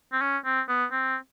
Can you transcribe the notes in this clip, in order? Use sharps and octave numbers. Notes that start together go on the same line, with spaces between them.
C4
C#4
C4
B3
C4